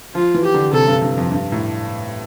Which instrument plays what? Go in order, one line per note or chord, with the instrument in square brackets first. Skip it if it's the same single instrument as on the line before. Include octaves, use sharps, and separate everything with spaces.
[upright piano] F3 [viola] F4
[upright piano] E3
[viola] G4
[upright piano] D3
[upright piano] C3 [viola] A4
[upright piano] G2
G2
F2
G2
A2